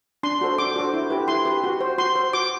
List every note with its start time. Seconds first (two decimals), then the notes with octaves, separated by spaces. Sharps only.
0.23 D4 C6
0.41 F#4 A4 C5
0.58 D4 D6
0.76 F#4 A4 C5
0.94 E4
1.10 G4 B4
1.28 E4 C6
1.45 G4 B4
1.64 F#4
1.81 C5
1.98 F#4 C6
2.16 C5
2.33 F#4 D6